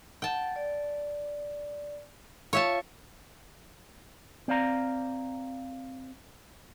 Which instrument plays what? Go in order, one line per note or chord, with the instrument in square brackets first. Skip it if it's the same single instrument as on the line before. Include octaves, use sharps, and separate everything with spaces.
[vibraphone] F#5 [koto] G5 A5
[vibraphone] D5
[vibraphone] F4 F5 [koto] C#5 E5 A5
[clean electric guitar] C4 D5 F5 A#5